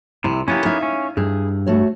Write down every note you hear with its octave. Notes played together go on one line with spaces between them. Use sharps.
C2 C3 E4
A#3 B3 C#4 E4 G4
D#4 E5 F5
C#4
G2 G#4
A3 F#4 C#5